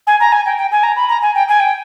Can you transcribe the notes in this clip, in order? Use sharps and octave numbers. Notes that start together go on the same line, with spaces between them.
G#5
A#5
G#5
G5
G5
G#5
A#5
B5
A#5
G#5
G5
G#5
G5